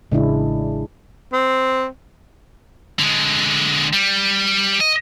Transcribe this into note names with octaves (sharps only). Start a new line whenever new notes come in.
A1 C#3 G#3 D4 E4
C4
D3 G#3
G3
D#5